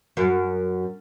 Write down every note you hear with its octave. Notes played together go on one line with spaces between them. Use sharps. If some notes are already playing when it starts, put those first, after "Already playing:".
F#2